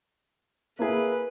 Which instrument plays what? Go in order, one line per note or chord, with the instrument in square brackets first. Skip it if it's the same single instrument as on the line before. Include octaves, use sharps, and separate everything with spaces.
[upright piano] A#3 E4 G#4 [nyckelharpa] B4